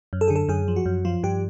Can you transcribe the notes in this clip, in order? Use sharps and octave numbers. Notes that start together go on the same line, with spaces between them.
F#2
A4
D3 G#4
A4
F#2 G#4
F3
F#4
F#2
F3 F4
G2 G4